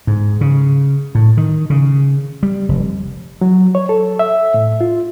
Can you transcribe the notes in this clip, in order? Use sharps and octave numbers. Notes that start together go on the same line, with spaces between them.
G#2
C#3
A2
D#3
C#3
G3
F1
F#3
C#5
A4
E5
A2
F4